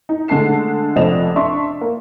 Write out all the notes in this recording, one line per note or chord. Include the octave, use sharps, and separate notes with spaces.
D#4
D3 G#3 A3 A5 C7 E7
F1 F2 D5 D#5 E7 F7
D4 D5 E5 A5 C6 C#6
A#3